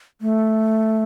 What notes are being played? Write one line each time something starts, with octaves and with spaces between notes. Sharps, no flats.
A3